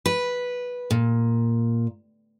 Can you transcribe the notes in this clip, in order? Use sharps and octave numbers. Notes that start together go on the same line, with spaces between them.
B4
A#2